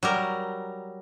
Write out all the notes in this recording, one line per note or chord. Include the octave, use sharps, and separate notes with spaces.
F#3 G3 A#4